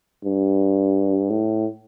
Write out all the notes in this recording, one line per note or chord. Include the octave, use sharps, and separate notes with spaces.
G2
A2